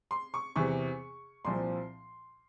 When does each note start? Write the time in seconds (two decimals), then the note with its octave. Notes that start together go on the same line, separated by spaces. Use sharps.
0.11 C6
0.34 C#6
0.56 E2 C3 E3 C#6
1.45 C2 A#2 F3 C4 C6